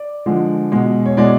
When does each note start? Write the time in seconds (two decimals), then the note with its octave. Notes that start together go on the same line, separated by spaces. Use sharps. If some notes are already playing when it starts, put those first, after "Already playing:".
Already playing: D5
0.26 D3 F3 G#3
0.72 B2 G#3
1.06 C#5
1.17 B2 G#3 D5